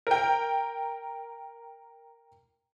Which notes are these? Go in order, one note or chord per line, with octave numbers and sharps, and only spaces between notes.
A#4 G5